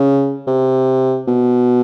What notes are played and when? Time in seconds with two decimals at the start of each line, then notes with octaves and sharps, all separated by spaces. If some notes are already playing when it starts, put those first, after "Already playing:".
Already playing: C#3
0.47 C3
1.28 B2